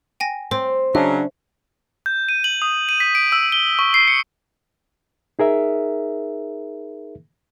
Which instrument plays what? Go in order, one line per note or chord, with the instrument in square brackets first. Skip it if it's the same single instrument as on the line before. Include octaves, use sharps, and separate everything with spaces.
[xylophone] G5 G#5 A#6
[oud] C4 [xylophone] C5
[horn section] C#3 F#3 [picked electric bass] D4 [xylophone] E5
[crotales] G6
D#7
F#7
D#6
D#7
B6
D7
E6
G7
C#6
C7
C#7
[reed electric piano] D#4 G#4 A#4 E5